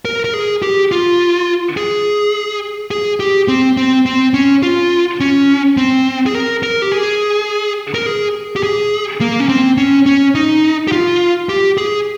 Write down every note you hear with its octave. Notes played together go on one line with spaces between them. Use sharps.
A#4
A#4
G#4
G4
F4
G#4
G#4
G4
C4
C4
C4
C#4
F4
C#4
C4
G#4
A#4
A#4
G4
G#4
A#4
G#4
G4
G#4
A#3
C#4
C4
C#4
C#4
D#4
G4
F4
G4
G#4